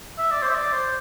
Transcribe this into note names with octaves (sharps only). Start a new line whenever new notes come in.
E5
D5
C5
E5
D5
C5